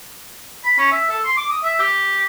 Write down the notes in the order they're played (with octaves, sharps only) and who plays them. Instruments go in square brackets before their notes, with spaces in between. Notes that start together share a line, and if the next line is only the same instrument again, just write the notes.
[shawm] B5
C#4
E5
A4
C6
D6
D#6
E5
G4